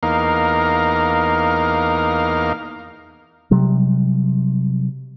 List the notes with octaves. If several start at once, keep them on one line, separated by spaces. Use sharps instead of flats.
E2 A#3 D#4 A#4 F5
C3 F#3 G3